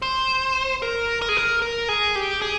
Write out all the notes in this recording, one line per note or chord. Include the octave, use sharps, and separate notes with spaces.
C5
A#4
A#4
G#4
A#4
A#4
G#4
G4
G#4